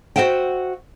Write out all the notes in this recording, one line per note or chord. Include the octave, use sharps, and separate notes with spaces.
F#4 G4 C5 E5 F#5 G5